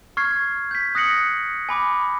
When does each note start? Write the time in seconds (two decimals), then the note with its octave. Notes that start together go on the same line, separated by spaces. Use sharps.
0.17 C#6 F6 G#6 C7
0.71 G6 B6
0.95 D#6 F#6 A#6 C7 C#7 F#7
1.69 G#5 B5 D6